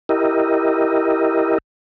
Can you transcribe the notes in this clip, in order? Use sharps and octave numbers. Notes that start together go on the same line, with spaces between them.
E4 G4 A#4 D#5